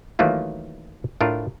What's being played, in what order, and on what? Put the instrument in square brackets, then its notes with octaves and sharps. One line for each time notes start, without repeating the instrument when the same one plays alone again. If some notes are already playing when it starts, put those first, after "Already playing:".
[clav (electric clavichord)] D#3 E3 F#3 A3 A#3 F4
A2 A3 D4 F4 A#4